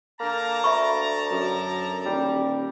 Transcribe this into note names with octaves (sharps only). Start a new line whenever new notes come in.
D3 A#3 A5 A#5
D2 E5 B5 C#6
F#2
D#1 G3